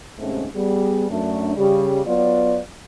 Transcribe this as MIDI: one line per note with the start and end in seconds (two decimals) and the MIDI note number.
0.19 0.45 39
0.19 0.45 44
0.19 0.45 48
0.19 0.45 57
0.19 0.45 60
0.19 0.45 61
0.55 1.10 55
0.55 1.10 59
0.55 1.10 68
1.10 1.53 42
1.10 1.53 57
1.10 1.53 62
1.56 1.99 49
1.56 1.99 55
1.56 1.99 67
2.06 2.59 54
2.06 2.59 59
2.06 2.59 65
2.06 2.59 74